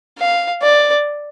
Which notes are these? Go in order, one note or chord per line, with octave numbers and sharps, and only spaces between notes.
F5
D5